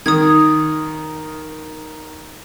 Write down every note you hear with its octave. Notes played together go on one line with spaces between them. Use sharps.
D#3 D#6 G#6